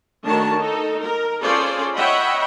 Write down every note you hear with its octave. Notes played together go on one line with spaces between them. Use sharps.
D#3 A3 D4 F#4 C#5 A5
D#4 A4
A#4
C#4 F4 G#4 A4 C5 D5
C#5 D#5 E5 F#5 G5 B5